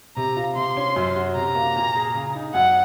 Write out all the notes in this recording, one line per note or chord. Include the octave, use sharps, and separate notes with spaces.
C3 A#5
F4
C3 C6
C#4
F#2
F#4
C3 A#5
A#3
A#2
G#4
C#3
D#4
F#2 F#5